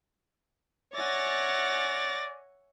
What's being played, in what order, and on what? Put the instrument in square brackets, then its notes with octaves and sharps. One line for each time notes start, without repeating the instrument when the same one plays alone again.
[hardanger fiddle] C#5 [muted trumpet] D5 [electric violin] E5 F#5 [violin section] G#5 A6 A#6